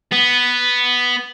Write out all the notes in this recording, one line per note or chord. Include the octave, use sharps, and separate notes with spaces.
B3